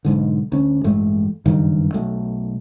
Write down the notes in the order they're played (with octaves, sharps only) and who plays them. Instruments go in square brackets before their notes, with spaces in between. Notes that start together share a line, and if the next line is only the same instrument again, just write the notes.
[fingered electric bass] B1 G#2 D3
D2 C#4
A1 G2 G#3 A3
F#1 G2 D#3
B1 A3